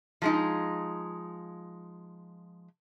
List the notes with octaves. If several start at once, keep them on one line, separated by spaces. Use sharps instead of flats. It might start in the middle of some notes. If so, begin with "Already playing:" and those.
F3 G#3 D#4